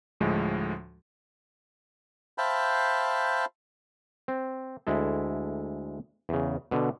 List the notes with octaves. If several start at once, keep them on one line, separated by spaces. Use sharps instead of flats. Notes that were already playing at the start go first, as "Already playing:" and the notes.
D2 A2 F3 G#3
C5 E5 F5 G5 A5 B5
C4
D2 G#3 E4 A4
E2 C#3
B2 D3